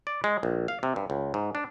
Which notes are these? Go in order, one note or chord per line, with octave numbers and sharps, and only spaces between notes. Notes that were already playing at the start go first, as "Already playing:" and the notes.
D5
G#3
A#1
F5
C3
G2
C#2
G#2
D4